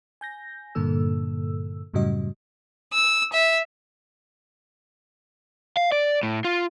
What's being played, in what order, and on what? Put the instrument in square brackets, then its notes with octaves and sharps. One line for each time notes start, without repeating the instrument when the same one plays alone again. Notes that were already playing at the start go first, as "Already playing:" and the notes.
[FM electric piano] G#5 G6 A#6
G2 A#2 D3 A#3 A4 E6
F#2 A2 C#3 G3 F#4 D#5
[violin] E6
E5
[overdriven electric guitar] F5
D5
A2
F4